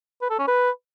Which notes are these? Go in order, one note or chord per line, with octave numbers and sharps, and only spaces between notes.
B4
A4
C#4
B4